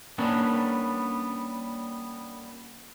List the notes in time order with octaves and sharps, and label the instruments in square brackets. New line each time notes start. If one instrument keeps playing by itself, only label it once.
[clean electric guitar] G3 A#3 B3 C#4 D4